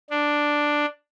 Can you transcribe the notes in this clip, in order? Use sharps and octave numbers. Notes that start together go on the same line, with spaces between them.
D4